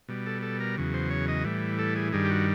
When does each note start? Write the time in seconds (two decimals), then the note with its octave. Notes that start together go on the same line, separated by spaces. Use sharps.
0.08 B2 G3
0.26 A4
0.42 A4
0.60 A#4
0.78 E2 C#3 F#3
0.94 C5
1.10 C#5
1.28 D#5
1.45 A2 E3 G3
1.79 A4
1.95 G#4
2.13 G2 D#3 G3 G#4
2.25 G4
2.31 F#4